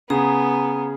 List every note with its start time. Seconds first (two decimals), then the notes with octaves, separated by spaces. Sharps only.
0.10 C#3 B3 G#4 A#5